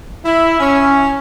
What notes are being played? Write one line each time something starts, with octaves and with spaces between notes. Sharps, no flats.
E4
C#4